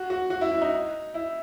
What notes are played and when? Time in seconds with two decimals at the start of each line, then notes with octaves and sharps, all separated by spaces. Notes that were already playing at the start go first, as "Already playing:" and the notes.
Already playing: F#4
0.10 F#4
0.30 F#4
0.41 E4
0.51 E4
0.62 D#4
1.14 E4